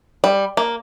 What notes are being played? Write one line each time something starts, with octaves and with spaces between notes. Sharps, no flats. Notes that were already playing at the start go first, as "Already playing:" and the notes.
G3
A#3